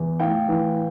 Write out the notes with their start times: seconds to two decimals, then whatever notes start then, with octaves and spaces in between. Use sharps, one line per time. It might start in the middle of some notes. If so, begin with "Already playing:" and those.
Already playing: E2
0.20 A2 F5 G5
0.48 E3